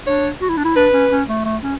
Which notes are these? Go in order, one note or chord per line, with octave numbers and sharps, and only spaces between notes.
D4 C#5
F#4
E4
D4
E4
D4 B4
C#4
C#4
A3
A3
C#4